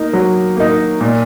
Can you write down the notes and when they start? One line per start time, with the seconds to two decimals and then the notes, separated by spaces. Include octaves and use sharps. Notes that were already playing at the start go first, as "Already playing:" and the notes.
Already playing: A#3 D#4
0.13 F#3
0.57 A#3 D#4
1.01 A#2